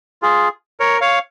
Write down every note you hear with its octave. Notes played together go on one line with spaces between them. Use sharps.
F4 G#4
A#4 C#5
C#5 F5